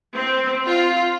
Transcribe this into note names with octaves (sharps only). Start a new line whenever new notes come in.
C4
F4